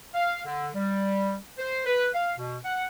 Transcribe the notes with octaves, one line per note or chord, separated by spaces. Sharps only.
F5
D3
G3
C5
B4
F5
B2
F#5